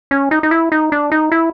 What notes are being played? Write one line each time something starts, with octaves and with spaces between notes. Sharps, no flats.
C#4
D#4
D#4
E4
D#4
D4
D#4
E4